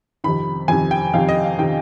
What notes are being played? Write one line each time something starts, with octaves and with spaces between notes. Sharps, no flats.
F2 C3 D#3 B5
F2 C3 D#3 G#5
G5
F2 C3 D#3 F5
D#5
F5
C3 D#3 G5